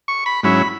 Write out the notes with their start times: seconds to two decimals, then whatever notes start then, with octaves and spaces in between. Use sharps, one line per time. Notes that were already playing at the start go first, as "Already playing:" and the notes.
0.08 C#6
0.26 B5
0.43 G#2 F#3 C#4 E4 B5